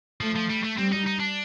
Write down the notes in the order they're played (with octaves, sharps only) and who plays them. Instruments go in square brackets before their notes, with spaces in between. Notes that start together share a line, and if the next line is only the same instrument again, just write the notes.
[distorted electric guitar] F3 [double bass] A3
[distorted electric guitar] F3
G3
A3
[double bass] G3 [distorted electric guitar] C4
[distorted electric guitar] D#4
D#4
D4